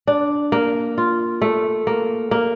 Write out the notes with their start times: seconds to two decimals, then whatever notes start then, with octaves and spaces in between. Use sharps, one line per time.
0.07 D4
0.52 A#3
0.98 F4
1.42 A3
1.87 A#3
2.31 A#3